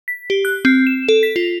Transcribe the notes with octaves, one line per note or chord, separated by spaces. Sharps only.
B6
G4
F#6
C4
E7
A4
B6
F4